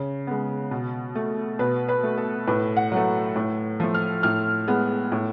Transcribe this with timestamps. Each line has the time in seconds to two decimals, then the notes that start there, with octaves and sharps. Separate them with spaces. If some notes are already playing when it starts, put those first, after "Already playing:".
Already playing: C#3
0.27 G#3 B3
0.71 B2
1.15 A3
1.59 B2 B4
1.88 B4
2.03 A3
2.18 A4
2.47 A2 B4
2.76 F#5
2.92 F#3 A3
3.36 A2
3.80 F3 A3
3.94 F6
4.23 A2 F6
4.67 G#3 B3
5.12 A2